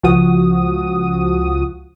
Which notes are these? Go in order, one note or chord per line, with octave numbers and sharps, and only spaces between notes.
C#2 F3 F#4 D#6